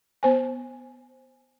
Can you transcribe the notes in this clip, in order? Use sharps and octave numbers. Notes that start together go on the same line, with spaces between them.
B3 C5 G#5